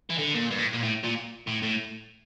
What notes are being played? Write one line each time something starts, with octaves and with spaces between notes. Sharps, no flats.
E3
D3
A#2
G2
A2
A#2
A2
A#2
A2
A2